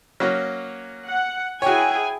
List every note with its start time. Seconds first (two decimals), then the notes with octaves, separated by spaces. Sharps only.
0.20 F#3 A#3 C#4
1.06 F#5
1.62 E4 F#4 G#4 C#5 G5 G#5